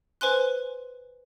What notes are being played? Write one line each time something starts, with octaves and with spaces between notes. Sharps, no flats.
B4 C5 G#5 C6 F#6